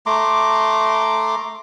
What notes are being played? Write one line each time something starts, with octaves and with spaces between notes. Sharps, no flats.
A3 A#5 C6 D6